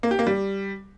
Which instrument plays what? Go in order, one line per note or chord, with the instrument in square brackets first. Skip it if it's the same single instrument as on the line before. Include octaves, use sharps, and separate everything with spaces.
[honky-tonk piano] A#3
G4
A#3
G3